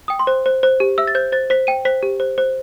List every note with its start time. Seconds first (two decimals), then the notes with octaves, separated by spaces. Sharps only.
0.08 G5 D#6
0.19 C6
0.27 C5
0.46 C5
0.63 C5
0.80 G4
0.98 E5 E6
1.07 A6
1.15 C5 G6
1.32 C5 A6
1.50 C5 B6
1.67 G5 D#7
1.85 C5 B6
2.03 G4
2.20 C5
2.38 C5